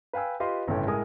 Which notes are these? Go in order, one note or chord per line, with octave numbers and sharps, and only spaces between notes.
B4 F5 G5 G#5 E6
F4 G4 B4 D#5 F5 C6
G1 A2 C#3 C#4 A4 G5
A2 G#3 A#4 G#5 D#6